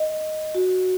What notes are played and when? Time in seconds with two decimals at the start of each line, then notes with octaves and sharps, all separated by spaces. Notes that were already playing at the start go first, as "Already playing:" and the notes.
Already playing: D#5
0.55 F#4